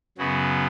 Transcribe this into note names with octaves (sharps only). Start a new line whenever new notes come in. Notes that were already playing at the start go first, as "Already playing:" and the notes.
F#2 C#3 F#3 B3